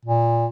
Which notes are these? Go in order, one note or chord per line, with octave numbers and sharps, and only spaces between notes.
A#2